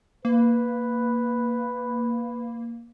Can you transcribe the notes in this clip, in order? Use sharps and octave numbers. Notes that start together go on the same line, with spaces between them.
A#3 B4